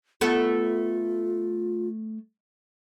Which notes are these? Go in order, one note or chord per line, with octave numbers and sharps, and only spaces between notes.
A3 B3 F4 A4